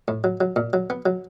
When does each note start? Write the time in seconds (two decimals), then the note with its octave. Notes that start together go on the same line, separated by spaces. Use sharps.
0.08 A2
0.24 F#3
0.41 F#3
0.56 A#2
0.73 F#3
0.90 B3
1.06 F#3